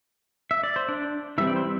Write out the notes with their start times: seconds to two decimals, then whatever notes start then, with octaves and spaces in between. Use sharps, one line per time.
0.51 E5
0.64 D5
0.76 C5
0.89 D4 D5
1.38 E3 G3 C4 E5
1.47 D5
1.56 C5